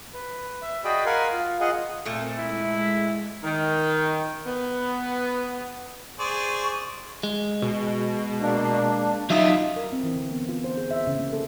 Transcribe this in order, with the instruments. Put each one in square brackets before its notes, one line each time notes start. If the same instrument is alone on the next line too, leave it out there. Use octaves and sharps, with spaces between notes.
[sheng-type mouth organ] B4
E5
F#4 G#4 D5 D#5 G5 B5
A#4 F5 F#5 G#5 B5 C6
F4
F4 G#4 D#5 F#5
[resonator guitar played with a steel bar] A#2 A3 [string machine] A#3 C4
[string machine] G#3 [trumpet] E4
[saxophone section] D#3
B3
[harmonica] G#4 C5 D5 [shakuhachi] C#6
[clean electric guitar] G#3
[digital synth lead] B2
[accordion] A#3 D4
[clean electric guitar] F#3 D#5 [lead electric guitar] D#4 F4 [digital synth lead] E5
[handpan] A#4
C4
E3
D3
B3
F4
C5
G#4
E5
C#3
A#3
A4